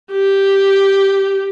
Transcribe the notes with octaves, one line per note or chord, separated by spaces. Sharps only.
G4